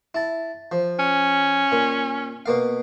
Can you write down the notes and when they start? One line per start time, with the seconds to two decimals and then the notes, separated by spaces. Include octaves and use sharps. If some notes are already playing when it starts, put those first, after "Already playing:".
0.15 E4 A5
0.72 F3
0.99 C#4
1.72 A#2
2.46 B2 A#3 F5